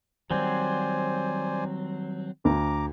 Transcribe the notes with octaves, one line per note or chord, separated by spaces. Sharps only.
D#3 F#3 G3 C4 C5 D5 G#5
D2 A#5 D6